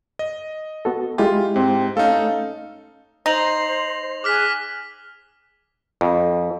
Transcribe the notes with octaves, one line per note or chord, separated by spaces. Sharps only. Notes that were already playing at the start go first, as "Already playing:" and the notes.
D#5
B3 F#4 A4
G#3 E4 F4 G4
G#2 C4
A3 C#4 D#4 A4 F5
D#4 C5 A#6 F7 F#7
G#4 D6 F6 F#6 B6
F2